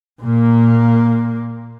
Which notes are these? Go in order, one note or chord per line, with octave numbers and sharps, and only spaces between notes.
A#2 A#3